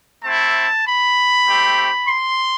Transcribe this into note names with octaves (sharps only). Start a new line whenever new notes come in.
A3 C4 E4 A5
B5
A3 C4 G4
C6